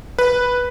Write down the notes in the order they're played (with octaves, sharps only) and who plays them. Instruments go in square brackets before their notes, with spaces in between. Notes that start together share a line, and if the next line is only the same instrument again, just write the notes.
[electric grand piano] B4